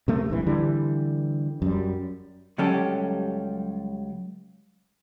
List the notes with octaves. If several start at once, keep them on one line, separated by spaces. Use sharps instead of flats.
C3 A3 A#3
D1 A#1 G2 E3
D3 E3 G3
F#2 G3
C#2 F#3 G3 C#4 G4 A4